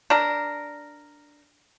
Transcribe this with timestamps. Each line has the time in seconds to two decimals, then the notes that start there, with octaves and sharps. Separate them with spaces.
0.10 D4 A#4